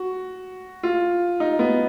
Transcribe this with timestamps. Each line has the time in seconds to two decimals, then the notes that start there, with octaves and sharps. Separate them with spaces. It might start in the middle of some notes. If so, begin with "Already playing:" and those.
Already playing: F#4
0.83 F4
1.40 D#4
1.59 B3